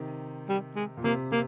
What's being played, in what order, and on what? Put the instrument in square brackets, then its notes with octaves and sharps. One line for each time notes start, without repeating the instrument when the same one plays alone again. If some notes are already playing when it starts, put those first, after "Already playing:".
Already playing: [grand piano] C3 D#3
[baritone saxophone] G3
G#3
[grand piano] A#2
[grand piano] C3 [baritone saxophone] A#3
[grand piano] C3 [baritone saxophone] A#3